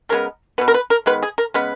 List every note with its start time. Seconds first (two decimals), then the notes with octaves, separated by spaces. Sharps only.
0.09 C#3 G#3 B3 A#4
0.58 B2 G#3 B3 B4
0.68 A#4
0.74 B4
0.90 A#4
1.06 D#3 G#3 B3 B4
1.23 G#4
1.38 A#4
1.54 C#3 G#3 B3 B4